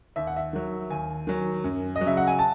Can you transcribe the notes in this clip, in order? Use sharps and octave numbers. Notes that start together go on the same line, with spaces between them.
D#2 E5
F#5
E5
D#3 F#3
D#2 G#5
D#3 F#3
F#2
D#5
F#3
C#3 E5
F#5
G#5
A5